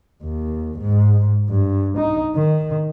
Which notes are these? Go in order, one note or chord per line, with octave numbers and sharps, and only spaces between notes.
D#2
G#2
G2
D#4
D#3